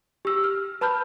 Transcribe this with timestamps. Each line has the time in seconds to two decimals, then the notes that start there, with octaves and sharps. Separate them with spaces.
0.25 G4 E6
0.44 F6
0.81 B4 A5 B5 F6 G6